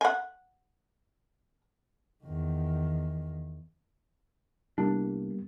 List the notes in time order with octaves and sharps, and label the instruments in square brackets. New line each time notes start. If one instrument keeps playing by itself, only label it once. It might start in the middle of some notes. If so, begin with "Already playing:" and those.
[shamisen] F#5 G#5
[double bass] E2 D#3
[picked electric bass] C2 D4 [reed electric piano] G3 A#3 B3